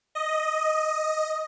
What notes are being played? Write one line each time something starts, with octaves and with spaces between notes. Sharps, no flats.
D#5